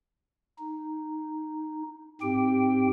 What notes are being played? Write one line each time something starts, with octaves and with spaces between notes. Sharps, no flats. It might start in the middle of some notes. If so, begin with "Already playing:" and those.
D#4
G#2 C4 G4 G5